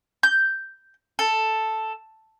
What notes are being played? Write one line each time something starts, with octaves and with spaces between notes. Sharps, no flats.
G6
A4